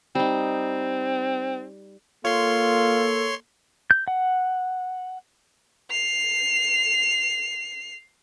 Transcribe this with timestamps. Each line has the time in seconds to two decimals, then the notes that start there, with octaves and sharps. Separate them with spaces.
0.15 G3 C4 D#4
2.25 A#3 F4 A4 C#5 C6
3.91 G6
4.08 F#5
5.91 C7 F7